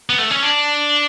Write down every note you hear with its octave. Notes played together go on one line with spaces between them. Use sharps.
B3
A3
C#4
D4